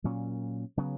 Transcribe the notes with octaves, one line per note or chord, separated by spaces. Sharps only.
A#2 F#3 C#4
C#3 F#3 B3